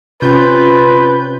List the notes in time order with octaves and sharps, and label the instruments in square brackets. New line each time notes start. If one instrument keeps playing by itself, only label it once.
[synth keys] C3 C#4 G6 [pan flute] F4 [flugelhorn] B4